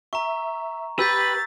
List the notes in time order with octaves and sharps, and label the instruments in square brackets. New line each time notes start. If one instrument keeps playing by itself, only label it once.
[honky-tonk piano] E5 [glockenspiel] A#5 C#6
[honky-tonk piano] G4 [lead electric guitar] B4 [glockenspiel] E6 G6 B6 [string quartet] A6